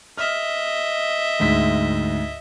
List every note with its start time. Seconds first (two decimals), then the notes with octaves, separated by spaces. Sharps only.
0.18 D#5 E5 F6
1.40 D2 G#2 B6